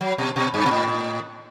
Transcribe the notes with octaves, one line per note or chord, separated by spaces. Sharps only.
F#3
B2
B2
G2
B2
A2